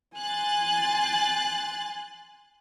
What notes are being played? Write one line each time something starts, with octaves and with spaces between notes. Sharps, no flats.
G#5 C6 F#6 A6